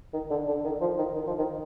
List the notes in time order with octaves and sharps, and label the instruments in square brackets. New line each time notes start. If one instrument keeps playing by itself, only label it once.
[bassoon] D#3
D3
D3
D#3
F3
D#3
D#3
F3
D#3